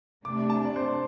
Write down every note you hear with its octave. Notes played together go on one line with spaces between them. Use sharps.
C3 A3 D4 D6
A5
D5
C5